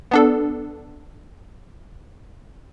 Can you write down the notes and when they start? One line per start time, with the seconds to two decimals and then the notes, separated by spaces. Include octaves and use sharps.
0.11 B3 D4 A4